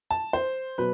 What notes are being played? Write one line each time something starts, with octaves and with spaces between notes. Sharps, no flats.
A5
C5
B2 F#3 B4